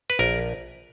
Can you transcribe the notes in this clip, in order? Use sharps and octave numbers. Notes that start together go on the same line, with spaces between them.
B4
A#1 A#4